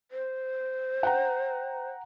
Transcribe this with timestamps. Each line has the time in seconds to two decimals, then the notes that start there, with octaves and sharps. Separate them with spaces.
0.11 C5
1.03 F#5 G5 A#5